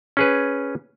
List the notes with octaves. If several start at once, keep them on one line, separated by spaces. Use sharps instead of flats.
C#4 G#4 B4